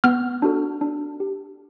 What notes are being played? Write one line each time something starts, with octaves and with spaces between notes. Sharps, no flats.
B3 F6
D4 F#4 A4
D4
G4